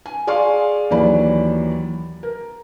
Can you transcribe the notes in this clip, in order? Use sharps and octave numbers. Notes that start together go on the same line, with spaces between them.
G#5
G#4 D5 F5 G#5 C6 C#6
D#2 E3 F#3 D5 B5
A#4